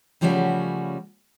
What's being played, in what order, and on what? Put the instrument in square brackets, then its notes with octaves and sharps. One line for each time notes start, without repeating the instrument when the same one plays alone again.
[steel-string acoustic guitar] C#3 F3 G3 A3 C#4 F#4